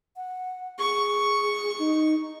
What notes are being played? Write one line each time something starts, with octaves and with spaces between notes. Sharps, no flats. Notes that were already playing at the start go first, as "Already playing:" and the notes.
F#5
G#4 C#6
D#4